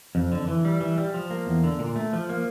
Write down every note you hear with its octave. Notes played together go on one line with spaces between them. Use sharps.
F2
D3
E3
G3
E3
G3
F3
A#3
E2
D3
A#2
A3
F3
A#3